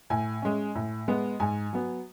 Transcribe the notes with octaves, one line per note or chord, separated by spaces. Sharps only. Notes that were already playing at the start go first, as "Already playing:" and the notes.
A2 G#5
G#3 C#4
A2
G#3 B3
G#2 G#5
F#3 B3